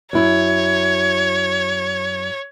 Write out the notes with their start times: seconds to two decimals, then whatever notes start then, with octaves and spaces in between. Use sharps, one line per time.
0.13 F#2 E4 C#5